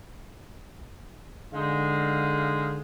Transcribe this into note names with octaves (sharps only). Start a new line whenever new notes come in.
D3 G#3 D#4 F5